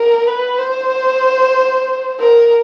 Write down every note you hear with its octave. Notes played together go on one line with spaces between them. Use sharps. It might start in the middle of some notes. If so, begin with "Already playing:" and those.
Already playing: A#4
B4
C5
A#4